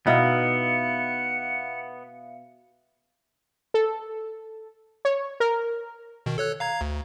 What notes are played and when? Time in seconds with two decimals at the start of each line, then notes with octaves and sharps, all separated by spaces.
0.07 B2 B3 D#4 E4 E5 F5 C#7
3.74 A4
5.05 C#5
5.40 A#4
6.26 B2 D#3
6.38 A4 C#5 F#6
6.60 F5 A#5 G#6
6.81 D2